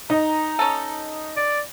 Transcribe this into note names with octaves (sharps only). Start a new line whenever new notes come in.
D#4 D#5 A#5
C#4 A4
D5